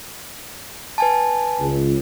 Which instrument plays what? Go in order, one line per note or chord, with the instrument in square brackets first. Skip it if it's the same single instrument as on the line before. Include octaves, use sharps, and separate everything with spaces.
[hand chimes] B4 G#5 A5
[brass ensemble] C#2